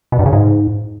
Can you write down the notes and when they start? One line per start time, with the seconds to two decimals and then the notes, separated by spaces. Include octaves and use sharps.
0.12 B2
0.19 G2
0.26 C#3
0.33 G#2